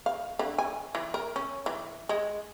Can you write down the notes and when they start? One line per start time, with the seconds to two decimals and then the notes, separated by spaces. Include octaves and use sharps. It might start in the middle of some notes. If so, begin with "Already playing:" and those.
0.06 F5
0.39 D3
0.58 G#5
0.95 E3
1.14 A#4
1.36 C#4
1.66 E3
2.09 G#3